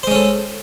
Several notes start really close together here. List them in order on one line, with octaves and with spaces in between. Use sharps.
C5 G#3 C#4 A4